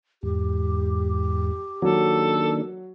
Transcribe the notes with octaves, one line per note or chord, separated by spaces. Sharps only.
E2 G#2 G4
D#3 F#3 A#3 D4 A4